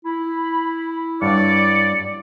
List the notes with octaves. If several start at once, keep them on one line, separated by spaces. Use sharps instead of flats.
E4 B5
G2 C#5 D5 F#5 C#7